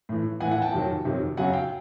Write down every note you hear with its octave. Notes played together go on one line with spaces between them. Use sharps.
A2 E3
A2 E3 F#5 G#5
F#5 G#5
G5 A5
F2 C3 D#3 F#3
F2 C3 D#3 F#3
F#2 C#3 F#3 F#5 G#5
F5 G5